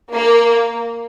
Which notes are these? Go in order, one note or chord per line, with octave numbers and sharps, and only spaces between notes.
A#3